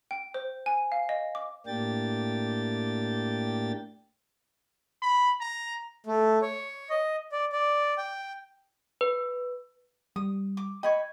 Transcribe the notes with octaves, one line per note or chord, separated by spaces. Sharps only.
G5
C5
G#5
F5
D#5
D6
A2 A#3 D4 G4 G5 A6
B5
A#5
A3
C#5
D#5
D5
D5
G5
B4
G3 D#6
D6
D#5 G5 B5 C#6 G#6